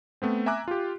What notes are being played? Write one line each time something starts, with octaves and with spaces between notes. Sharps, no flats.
A3 B3 C4
E5 G#5 A#5 D6 F#6
F4 G4